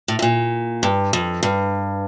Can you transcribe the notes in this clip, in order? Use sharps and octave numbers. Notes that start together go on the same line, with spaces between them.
A2
A2
A#2
G2
F2
G2